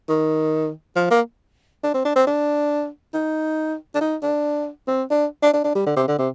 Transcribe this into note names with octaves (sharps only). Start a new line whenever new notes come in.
D#3
F3
A#3
D4
C4
D4
C4
D4
D#4
D4
D#4
D4
C4
D4
D4
D4
D4
G3
D3
C3
D3
C3